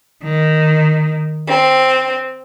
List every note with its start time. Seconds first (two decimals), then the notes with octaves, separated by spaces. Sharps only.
0.23 D#3
1.46 C4